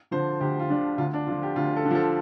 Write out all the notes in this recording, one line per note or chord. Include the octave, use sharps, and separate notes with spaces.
D3 F3 C5
D2 G4
F4
D3 F3 D4
D2 F4
D4
D3 F3 F4
G4
D2 F4
A4
D3
F3 A4